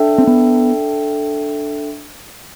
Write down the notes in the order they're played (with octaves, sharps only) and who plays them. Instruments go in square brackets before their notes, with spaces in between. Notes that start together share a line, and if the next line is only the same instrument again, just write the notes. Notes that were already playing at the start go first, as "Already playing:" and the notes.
Already playing: [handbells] D4 A4 E5 G5
[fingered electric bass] C4
B3